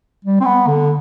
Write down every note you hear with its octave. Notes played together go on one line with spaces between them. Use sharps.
G3
C4
B3
D3